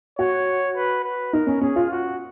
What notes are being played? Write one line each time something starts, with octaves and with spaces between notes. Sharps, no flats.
F#4 C#5
B4
B4
D#4 A#4
C#4
C#4 G#4
F4
F#4